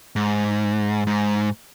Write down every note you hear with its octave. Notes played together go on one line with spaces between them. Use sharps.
G#2
G#2